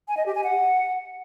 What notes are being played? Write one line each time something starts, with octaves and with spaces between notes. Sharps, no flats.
G#5
D#5
G4
G#5
F#5